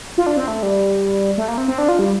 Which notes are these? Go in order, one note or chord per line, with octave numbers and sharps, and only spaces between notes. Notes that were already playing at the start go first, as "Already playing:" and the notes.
F4
D4
C4
A3
G3
A3
A#3
C4
C4
D4
F4
G3